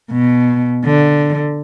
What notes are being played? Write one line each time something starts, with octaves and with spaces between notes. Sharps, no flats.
B2
D3